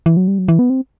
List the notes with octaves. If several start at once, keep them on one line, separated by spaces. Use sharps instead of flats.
E3
F#3
G3
F#3
E3
B3
C4